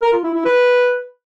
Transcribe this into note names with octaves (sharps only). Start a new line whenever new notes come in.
A#4
F4
E4
E4
B4